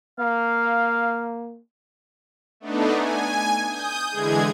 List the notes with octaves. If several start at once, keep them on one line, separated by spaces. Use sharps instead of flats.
A#3 F5
A3 B3 D4 D#4
G#5
D#6 G6
D3 E3 G#3 G#4 G#6